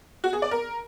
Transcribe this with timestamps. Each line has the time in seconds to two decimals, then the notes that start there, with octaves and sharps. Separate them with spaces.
0.24 F#4
0.33 G#4
0.42 D5
0.51 A#4